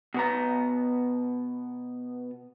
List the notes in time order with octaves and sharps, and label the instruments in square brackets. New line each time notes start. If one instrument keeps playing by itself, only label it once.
[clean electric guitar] B2 B3 A#5